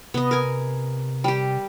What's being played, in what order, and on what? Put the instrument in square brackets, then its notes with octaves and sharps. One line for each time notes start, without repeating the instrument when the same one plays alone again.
[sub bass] C3 [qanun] B3 D#5
[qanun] A#4 G#5
G3 G4